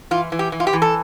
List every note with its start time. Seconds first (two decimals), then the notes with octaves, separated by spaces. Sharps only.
0.11 E3 F4
0.32 E3
0.39 G4
0.52 E3
0.60 F4
0.67 G4
0.73 E3
0.82 A4